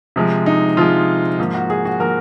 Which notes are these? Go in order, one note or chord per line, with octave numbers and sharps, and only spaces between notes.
C3 F3 G#3
D#4
C3 F3 G#3 F4
G#2 F3 A#3
F#4
G#4
F#4
F3 A#3 A#4